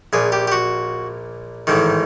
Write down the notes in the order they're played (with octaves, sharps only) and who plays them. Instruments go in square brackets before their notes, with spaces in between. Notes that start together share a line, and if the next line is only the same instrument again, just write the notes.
[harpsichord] A#1 A#2 G#4
G4
G4
F#4
A1 G#2 D#3